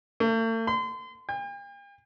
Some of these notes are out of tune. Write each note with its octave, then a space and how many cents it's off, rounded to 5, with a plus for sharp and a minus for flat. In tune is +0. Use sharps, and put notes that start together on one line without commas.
A3 +45
C6 -35
G5 +45